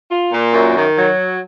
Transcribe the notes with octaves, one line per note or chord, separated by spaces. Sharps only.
F4
A#2
F#2
D#3
F#3